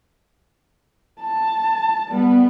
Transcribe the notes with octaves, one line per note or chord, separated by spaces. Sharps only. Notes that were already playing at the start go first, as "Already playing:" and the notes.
A5
G3 B3